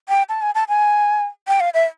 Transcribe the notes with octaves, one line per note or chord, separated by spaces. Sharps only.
G5
A5
G#5
A5
G#5
G5
F5
E5